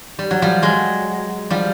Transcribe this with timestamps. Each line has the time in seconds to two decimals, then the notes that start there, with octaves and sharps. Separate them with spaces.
0.19 G3
0.31 F#3
0.42 F3 G3
0.63 F#3 G#3
1.50 F3 G3